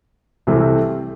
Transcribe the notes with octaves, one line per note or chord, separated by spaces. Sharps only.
C2 C3 E3 A3 C4